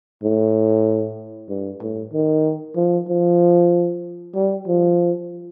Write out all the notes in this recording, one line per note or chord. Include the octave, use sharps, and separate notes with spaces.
A2
G2
A2
D#3
F3
F3
G3
F3